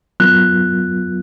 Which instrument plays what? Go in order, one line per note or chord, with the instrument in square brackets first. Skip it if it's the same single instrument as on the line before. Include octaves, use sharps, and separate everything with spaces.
[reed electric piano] F#3 B3 F4 A#4 [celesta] F#6